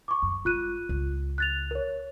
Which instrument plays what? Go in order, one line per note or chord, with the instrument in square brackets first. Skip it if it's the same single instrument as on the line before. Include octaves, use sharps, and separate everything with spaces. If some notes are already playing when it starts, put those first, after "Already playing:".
[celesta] C#6 D6
[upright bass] F#2
[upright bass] G#1 [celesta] F4 F#6 D#7
[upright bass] C#2
[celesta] F#6 A6 F7
A#4 C#5